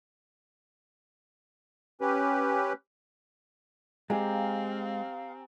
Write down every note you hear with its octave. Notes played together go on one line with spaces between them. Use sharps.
C#4 G4 B4
G#3 C4 G4 F5 G#5 A#5